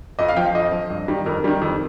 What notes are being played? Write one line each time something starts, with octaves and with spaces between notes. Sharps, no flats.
F2 D#5
F5
F3 G5
F5
F2 D#5
F3
G2
D#3 G3
F2 A#4
D#3 G3
F2